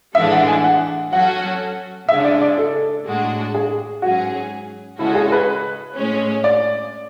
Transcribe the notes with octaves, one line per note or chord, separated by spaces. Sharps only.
A2 E3 G#3 D4 A4 E5
F#5
G#5
F#5
F#3 C#4 F#4 A4 F#5
C#3 G#3 D4 E5
D5
D5
A4
A2 G#3 D4 F#4
G#4
G#2 F#3 C#4 F#4 G#4
C#3 G#3 C#4 E4 F#4 A4
G#4
B4
A2 G#3 C#4
D5